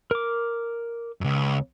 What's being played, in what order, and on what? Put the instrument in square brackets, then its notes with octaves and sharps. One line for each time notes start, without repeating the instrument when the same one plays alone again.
[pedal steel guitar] A#4 D6
[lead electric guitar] C#2 F#2